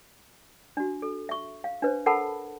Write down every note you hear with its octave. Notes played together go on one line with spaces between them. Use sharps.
D4 F#4
A4
E5 C#6
F5
D4 B4 C5
A4 A#4 F#5 A5 B5